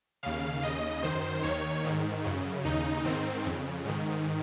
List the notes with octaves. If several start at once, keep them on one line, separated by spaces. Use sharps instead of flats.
D#2 C#3 F5
D#2 C#3 D#5
F#2 D#3 C5
D#2 D#3 C#5
G#2 D#3
F#2 C#3
D#2 C#3 D#4
G#2 D#3 C4
F2 C#3
G#2 D#3